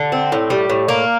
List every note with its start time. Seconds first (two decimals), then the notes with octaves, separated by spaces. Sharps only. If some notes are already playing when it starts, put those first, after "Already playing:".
Already playing: D3
0.12 C4
0.32 A2
0.50 G3
0.70 A2
0.89 A#3